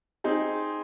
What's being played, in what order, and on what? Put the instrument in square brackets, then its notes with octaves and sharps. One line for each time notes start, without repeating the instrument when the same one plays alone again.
[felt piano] C4 D#4 G#4